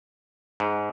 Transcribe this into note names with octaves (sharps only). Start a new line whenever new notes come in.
G#2